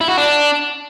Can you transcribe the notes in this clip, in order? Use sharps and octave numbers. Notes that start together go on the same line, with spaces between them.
E4
F#4
D4